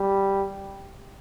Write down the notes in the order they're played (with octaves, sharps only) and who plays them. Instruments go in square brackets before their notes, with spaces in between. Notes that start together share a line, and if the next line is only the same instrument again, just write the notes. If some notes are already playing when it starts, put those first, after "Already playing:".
Already playing: [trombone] G3